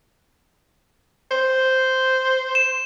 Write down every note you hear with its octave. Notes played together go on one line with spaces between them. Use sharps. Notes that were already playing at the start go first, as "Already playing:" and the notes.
C5
E7